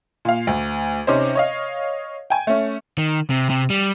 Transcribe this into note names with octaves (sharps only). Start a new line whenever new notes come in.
A#2 F5
D2
C3 C#4 D#4 C5
C#5 D#5 F5
G5 G#5
A3 C#4
D#3
C3
C3
G3